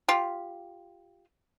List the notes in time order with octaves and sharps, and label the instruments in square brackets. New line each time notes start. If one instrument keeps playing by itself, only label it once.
[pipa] F4 G4